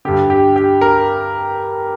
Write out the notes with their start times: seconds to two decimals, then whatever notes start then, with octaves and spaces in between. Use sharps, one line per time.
0.05 G2 D3 G4
0.30 G4
0.56 G4
0.81 A#4